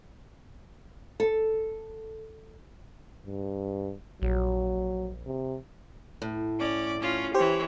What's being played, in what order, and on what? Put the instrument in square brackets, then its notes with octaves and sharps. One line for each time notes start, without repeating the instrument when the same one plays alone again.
[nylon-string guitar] A4
[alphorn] G2
[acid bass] A#1 [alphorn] F#3
[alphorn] C3
[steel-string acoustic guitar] A2
[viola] C#4 D5
C#4 F4
[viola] E3 C#5 [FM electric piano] G4 C5